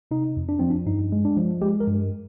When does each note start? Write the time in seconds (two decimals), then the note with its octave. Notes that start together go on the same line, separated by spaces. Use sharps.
0.11 C3 D#4
0.37 F2
0.49 D4
0.59 F3 C4
0.70 D4
0.86 G2 D#4
1.12 G#3
1.25 D4
1.37 F3
1.62 G#3 G4
1.80 A#4
1.87 G2